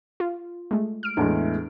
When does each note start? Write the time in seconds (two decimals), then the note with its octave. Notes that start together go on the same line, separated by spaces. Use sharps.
0.20 F4
0.71 G#3 A3
1.03 F6 D7
1.17 E2 A2 G#3 D4 G#4